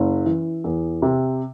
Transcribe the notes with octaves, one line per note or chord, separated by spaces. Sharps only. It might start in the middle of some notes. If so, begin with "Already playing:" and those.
Already playing: F#1
E3
E2
C3